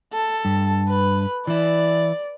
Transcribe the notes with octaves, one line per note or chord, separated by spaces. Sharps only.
A4
G2
B4
E3 E4 D5